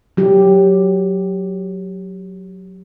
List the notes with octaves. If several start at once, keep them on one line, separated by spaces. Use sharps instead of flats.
F#3 G4